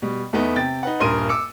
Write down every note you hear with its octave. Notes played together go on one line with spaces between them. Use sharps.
B2 G3
E2 A3 B3 D#4
C3 G5 A6
D#4 B4 F#5
D#1 G2 A#4 C6 D#6 D#7
D6 E6 C#7